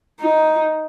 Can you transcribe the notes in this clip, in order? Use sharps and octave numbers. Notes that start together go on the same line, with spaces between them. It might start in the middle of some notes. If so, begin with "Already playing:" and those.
D#4